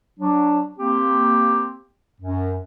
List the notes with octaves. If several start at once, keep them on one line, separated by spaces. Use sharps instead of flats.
F#3 D4
A#3 C4 G4
F#2